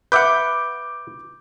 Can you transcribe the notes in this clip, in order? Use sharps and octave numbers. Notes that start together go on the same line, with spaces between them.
B4 E5 F#5 D6 G6